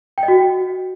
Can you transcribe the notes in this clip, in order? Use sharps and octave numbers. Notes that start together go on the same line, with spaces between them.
G5
D#5
F#4